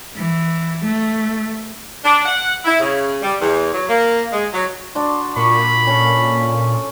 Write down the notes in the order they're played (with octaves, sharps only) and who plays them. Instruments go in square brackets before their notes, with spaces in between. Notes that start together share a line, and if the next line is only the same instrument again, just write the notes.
[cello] E3
A3
[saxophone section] D4
F#5
E4
C#3
G3
E2
F#3
A#3
G#3
F#3
[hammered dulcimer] D4 F#4 C6
[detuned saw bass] A#2 [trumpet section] B5 [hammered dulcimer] C#6
[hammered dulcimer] C#4 A4